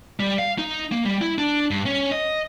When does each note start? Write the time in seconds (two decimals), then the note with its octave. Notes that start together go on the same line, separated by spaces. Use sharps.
0.20 G3
0.39 F5
0.58 D#4
0.92 A#3
1.05 G3
1.22 E4
1.38 D4
1.71 G2
1.86 C#4
2.12 D#5